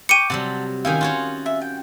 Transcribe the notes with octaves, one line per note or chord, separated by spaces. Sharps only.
G5 C#6 D6 C#7 D#7
C3 F#3 G3 F#5 A5
D#3 C#4 E4 F5 G5 G#5
F4 F#4 C#5
E5
G5